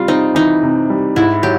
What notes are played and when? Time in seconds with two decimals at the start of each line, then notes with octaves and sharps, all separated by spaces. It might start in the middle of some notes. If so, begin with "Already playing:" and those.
Already playing: C3 G3 F4
0.08 C4 D#4
0.35 E3 D#4
0.63 C3
0.90 G3
1.16 G#2 E4
1.43 F#3 G4